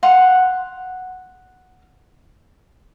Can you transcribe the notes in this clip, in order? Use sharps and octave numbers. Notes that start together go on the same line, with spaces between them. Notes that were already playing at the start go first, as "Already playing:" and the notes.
F5 F#5 C6